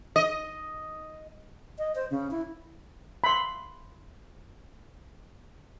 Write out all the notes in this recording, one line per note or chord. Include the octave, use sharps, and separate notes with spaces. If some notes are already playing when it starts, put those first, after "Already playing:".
D#5
D#5
C5
C#3
E4
B5 C6